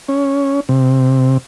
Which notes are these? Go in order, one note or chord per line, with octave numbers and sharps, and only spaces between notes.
C#4
C3